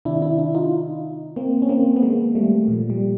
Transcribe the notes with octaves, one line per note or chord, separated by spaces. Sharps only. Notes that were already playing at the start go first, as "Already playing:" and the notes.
C3 D#3 D4 E4
D4 E4
D4 E4
D#4 F4
A#3 C4
C#4
A#3 C4
B3
G#3 A#3
G3 A3
A#2 F3
G3